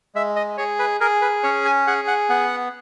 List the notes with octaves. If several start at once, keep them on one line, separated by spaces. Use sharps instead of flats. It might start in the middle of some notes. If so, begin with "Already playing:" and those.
G#3 E5
D#5
G#4 C#5
B4
G#4 A#4
B4
C#4 C#5
G#5
G#4 F#5
F#5
B3 F#5